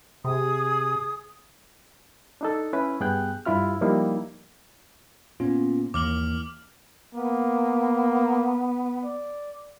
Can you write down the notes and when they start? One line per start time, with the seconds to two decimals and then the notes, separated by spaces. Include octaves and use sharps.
0.25 C3 G#4 D#6
2.41 D4 D#4 A4
2.73 C#4 E4 B4
3.00 G2 B3 G#4 G5 F#6 G6
3.46 G2 E4 F4 F6
3.81 F3 G3 A#3 D#4 E4
5.40 A#2 B3 C#4 F4
5.94 D#2 E3 A#3 D6 F6 F#7
7.15 A#3 B3
9.04 D5